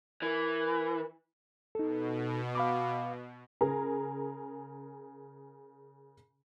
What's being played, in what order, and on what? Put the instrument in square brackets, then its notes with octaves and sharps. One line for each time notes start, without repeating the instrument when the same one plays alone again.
[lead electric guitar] E3 [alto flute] A#4
[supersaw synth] B2 [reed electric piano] D#4 A4
[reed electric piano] F5 B5 D6
[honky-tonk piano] C#3 G#4 A#4 A#5